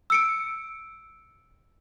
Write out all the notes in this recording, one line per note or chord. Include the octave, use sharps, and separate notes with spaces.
E6 C#7 D7